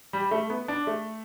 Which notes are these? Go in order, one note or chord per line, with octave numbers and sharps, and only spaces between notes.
G3
A3
B3
D4
A3